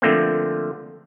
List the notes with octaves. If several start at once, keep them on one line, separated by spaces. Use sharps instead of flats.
D3 F3 A3 A#3 C4